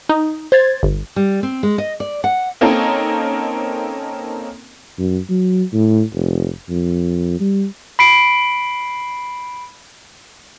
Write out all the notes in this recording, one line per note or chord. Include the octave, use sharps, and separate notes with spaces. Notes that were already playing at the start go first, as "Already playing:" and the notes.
D#4
C5 G#6 A6
G1
G3
C4
G#3
D#5
D5
F#5
A#3 C4 C#4 D#4 A4 A#4
F#2
F#3
A2
F1
F2
G3
B5 C7 D7